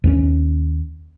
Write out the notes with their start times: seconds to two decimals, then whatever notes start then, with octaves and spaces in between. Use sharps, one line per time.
0.04 D#2 B3 C#4